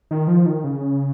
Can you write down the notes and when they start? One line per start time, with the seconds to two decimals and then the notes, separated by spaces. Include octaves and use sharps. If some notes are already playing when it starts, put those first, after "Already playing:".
0.11 D#3
0.27 F3
0.46 D#3
0.64 C#3